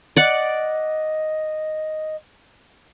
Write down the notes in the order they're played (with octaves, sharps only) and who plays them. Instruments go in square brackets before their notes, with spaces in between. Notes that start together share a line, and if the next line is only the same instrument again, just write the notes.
[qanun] D5 F#5 [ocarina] D#5